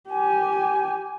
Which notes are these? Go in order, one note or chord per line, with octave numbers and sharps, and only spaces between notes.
G4 G#5